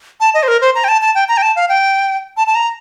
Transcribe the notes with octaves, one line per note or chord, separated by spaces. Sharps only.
A5
D#5
C5
A#4
C5
A#5
G5
A5
A5
G5
A#5
G5
A5
F5
G5
A5
A5
A#5